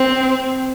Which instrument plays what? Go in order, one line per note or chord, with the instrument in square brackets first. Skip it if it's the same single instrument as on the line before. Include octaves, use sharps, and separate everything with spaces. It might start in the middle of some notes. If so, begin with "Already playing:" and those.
Already playing: [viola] C4